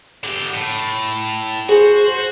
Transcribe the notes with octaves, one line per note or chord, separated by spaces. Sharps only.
D3 G4
A2
F#4 G#4 C5